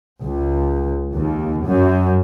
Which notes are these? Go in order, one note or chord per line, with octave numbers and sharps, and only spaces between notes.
C#2
D#2
F#2